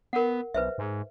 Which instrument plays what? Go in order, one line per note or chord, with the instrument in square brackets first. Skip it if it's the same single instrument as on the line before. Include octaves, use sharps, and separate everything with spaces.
[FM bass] B3 [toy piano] A#4 F#5
[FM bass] B1 [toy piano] B4 C5 E5
[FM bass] G#2